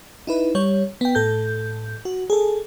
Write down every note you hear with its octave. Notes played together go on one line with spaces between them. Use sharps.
D#4 E4 B4
G3 C#5
B3 G5
A2 A4 G6
F#4
G#4 A4